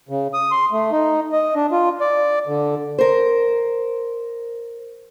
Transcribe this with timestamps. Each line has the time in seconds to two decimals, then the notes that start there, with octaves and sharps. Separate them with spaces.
0.09 C#3
0.34 D#6
0.51 C6
0.72 A3
0.92 D#4
1.32 D#5
1.55 D4
1.72 F4
2.01 D5
2.47 D3
2.98 A#4 C5